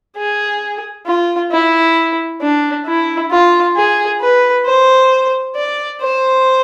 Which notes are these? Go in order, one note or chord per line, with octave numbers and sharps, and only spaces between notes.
G#4
F4
E4
D4
E4
F4
G#4
B4
C5
D5
C5